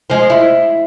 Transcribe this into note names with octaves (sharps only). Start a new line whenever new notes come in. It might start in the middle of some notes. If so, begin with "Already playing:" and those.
F3 G#3
E4